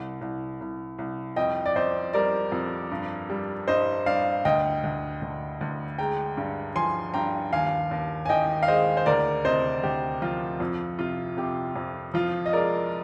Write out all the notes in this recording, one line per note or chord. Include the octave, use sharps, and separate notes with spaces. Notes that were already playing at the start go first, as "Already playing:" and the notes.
Already playing: C2
C2
C2
C2
F2 D#5 G5
D5
F2 C5 D#5
G3 A#4 D5
F2
G2
G3
G2 C5 D#5
G2 D5 F5
D2 D#5 G5
D2
D2
D2
G#3 G5 A#5
G2
F3 G#5 C6
G2 G5 A#5
D#2 F5 G#5
D#2
G#5
D#3 D#5 G5
F5
G#3 C5 D#5
C5
D2 A#4 D5
C3 C5 D#5
D2 G4
F3 F4
F2
C3 F4
C3 G4
F2
F3 F4
D#5
G#3 A#4 D5